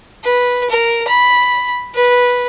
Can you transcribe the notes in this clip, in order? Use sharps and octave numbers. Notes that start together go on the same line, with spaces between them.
B4
A#4
B5
B4